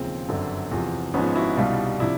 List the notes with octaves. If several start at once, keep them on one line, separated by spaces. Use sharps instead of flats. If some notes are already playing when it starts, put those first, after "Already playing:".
Already playing: E1 D#2 C#3 F3 C4
G1 F#2 D3
E2 C3 F3
G#1 G#2 F3 B3 C#4
E4 F#4
C2 B2 G3 D#4 F4
C3 F3 D4 E4